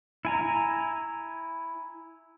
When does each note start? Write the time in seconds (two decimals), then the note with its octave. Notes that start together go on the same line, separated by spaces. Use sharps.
0.25 E4 G#5 A#5